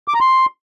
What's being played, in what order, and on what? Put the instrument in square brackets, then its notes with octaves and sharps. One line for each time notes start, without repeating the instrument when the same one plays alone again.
[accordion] D6
A#5
C6